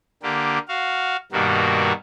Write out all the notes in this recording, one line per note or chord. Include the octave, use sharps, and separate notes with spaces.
D3 A#3 G4
F#4 F5
G2 B2 D#3 G3 A#3 F#4